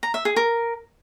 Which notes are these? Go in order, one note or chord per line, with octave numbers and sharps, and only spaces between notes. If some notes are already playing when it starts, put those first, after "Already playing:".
A#5
E5
G#4
A#4